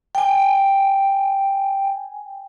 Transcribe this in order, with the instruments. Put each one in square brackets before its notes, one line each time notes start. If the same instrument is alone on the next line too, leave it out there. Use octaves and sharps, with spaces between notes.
[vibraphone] G5 G#5